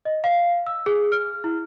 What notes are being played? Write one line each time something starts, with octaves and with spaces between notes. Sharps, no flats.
D#5
F5
E6
G#4
F6
E4